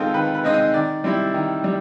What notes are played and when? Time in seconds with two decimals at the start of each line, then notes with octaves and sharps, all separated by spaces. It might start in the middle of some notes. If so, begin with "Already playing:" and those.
Already playing: D#3 G#3 C4 D#4 F4 A4 A#4
0.14 D#3 B4
0.34 B4
0.44 G#3 C4 D#4
0.54 D#5
0.74 D#3 D5
1.04 G3 C4 E4
1.34 D#3
1.64 G3